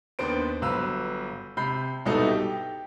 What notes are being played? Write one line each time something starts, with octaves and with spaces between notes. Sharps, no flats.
D#2 B3 D4 C5 D7
G1 F#3 B4 F5 E6
C3 B5 G6 C7
C2 G2 B2 D#4 E4 A4
G4